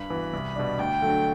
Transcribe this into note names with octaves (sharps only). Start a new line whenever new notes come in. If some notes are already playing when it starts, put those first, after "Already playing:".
Already playing: G2 B5
E3 B3 F#4
C2
B2 G3 D4
D2 G5
D3 F#3 A3